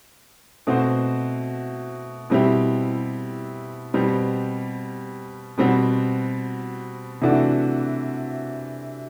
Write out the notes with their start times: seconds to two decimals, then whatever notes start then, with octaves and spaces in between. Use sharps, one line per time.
0.67 B2 A3 C4 F#4 C5
2.30 B2 G3 C4 E4 G4
3.94 B2 G3 C4 G4 C5
5.58 B2 G3 C4 F#4
7.21 C3 E3 A3 D4 F#4